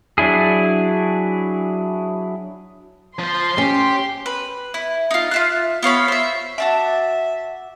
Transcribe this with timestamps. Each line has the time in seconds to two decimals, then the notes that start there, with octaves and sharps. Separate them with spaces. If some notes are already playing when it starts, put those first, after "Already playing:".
0.18 F#3 D4 E4 G#4
3.19 F3 C5 C6
3.58 C#4 G4
4.26 B4
4.74 E4
5.11 D#4 F4
5.31 F4 E5 F#6
5.83 B3 F4 C#5 B5
6.08 C5 E5
6.58 F#4 E5 A5 D6